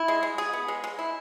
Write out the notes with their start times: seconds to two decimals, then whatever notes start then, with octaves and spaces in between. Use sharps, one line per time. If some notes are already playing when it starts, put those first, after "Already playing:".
Already playing: E4
0.08 G#3
0.23 G#3
0.38 G#4
0.53 B3
0.68 G#3
0.84 G#3
0.99 E4